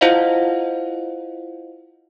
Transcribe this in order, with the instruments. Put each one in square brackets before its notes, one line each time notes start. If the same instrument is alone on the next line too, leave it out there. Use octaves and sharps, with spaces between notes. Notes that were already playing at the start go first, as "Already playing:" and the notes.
[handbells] E4 F4 C5 D#5 F5 F#5